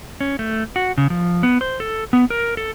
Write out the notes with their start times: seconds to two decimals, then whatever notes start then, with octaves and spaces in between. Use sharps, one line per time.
0.21 C#4
0.39 A3
0.76 F#4
0.98 C#3
1.10 F3
1.43 B3
1.61 C5
1.80 A4
2.13 B3
2.30 A#4
2.57 A4